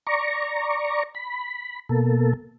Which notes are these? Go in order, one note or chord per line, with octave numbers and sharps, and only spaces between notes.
D5 A#5 C#6
B5
B2 A#3 A4